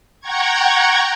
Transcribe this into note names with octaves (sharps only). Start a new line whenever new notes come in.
F#5 G5 A#5 C#6 G#6